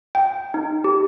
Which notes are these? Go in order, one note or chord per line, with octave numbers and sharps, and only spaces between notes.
G5
D#4
G4